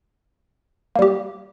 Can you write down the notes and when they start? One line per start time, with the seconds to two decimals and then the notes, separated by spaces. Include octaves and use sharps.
0.96 A#3
0.99 G3
1.02 G4